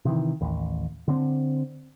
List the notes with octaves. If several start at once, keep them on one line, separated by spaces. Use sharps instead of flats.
C3 D#3 E3
A1 D#2
D3 C4